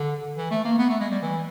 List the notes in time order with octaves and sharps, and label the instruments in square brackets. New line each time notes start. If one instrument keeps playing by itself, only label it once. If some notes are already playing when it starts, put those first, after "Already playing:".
Already playing: [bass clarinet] D3
E3
A3
A#3
B3
A3
G#3
G3
E3